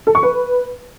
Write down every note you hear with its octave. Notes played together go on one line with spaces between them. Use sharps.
A4
C#6
B4